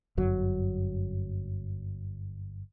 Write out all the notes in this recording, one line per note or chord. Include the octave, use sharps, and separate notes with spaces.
G1 F#2 F#3